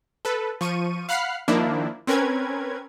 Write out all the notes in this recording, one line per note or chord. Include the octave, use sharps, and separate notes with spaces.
A4 B4
F3 C#6 D#7
F5 F#5 B5 F6 F#6 C7
D#3 F3 A#3 D4 E4
C4 C#4 A#4 B4 G#6